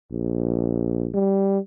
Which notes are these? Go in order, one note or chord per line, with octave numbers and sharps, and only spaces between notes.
A#1
G3